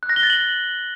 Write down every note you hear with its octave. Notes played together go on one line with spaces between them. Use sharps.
F#6
A#6
G7
A6
F#7